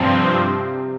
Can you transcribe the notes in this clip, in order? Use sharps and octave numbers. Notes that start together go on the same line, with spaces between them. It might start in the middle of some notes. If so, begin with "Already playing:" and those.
Already playing: G2 C3 F3 C4